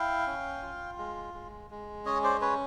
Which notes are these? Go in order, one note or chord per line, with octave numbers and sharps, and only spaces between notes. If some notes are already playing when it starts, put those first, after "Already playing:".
Already playing: E4 F5 G5
C#4
F4
G#3
G#3
G#3
C#4 C#5 D#5
C5 D5
C#4 B4 C#5